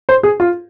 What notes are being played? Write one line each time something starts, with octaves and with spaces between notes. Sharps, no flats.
C5
G#4
F4